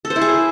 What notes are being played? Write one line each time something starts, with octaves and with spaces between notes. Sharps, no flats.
A4
C5
E4
G#4